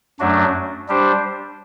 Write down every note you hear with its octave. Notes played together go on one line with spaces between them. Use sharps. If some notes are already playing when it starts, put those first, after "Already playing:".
F#2 F#3 A3 D4 F#4
G3 D4 G4 C5